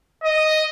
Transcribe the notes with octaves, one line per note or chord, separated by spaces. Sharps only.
D#5